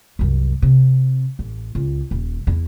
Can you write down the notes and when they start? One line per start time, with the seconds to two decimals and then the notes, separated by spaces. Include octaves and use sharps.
0.19 C2 F#2
0.62 C3
1.39 A1
1.75 C#2
2.11 D#1
2.47 E2 E4